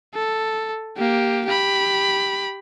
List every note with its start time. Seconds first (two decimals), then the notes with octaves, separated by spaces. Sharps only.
0.15 A4
0.98 A#3 G4
1.46 G4 B5